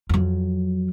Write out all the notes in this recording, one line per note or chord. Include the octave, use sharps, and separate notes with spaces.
F2 F#3